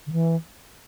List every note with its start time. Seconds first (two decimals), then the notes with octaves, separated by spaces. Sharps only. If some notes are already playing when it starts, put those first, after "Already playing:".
0.07 D3
0.12 E3